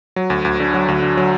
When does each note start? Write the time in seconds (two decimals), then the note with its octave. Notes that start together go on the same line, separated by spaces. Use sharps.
0.16 F#3
0.30 D2
0.45 D2
0.60 D3
0.74 F#3
0.88 D2
1.02 D3
1.17 F#3